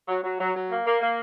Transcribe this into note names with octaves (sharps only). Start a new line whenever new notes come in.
F#3
F#3
F#3
F#3
A#3
A#3
A#3